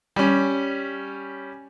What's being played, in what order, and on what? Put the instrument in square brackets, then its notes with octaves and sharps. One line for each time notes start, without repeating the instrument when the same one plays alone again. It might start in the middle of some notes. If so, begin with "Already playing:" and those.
[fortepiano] G3 C#4